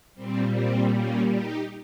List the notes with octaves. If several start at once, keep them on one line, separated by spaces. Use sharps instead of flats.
A#2 G3 C4
C4
A#3 C#4
D#4 G4